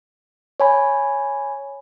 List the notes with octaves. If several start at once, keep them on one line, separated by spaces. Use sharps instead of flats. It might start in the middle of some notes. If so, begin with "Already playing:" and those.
C#5 G#5 B5